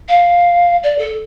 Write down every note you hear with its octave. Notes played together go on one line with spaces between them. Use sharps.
F5
D5
A4